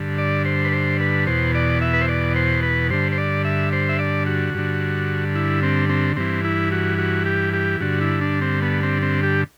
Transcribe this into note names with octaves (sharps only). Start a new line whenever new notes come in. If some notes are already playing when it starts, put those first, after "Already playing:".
Already playing: G2 D3
D5
C5
B4
C5
B4
E2 B2 C5
D5
E5
B4
C5
D5
C5
B4
G2 D3 C5
C5
D5
E5
C5
E5
D5
F#4
G2 D3
E4
C4
C4
G2 E3 C4
E4
F#4
F#4
G4
G4
G2 D3 F#4
E4
D4
C4
B3
C4
C4
G4